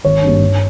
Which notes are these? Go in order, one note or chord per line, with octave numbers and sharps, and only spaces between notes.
G#1 C#5
G2 G3 A#3
G2